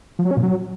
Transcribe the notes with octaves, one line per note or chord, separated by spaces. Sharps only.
F3
F#3
C#4
A#2
F#3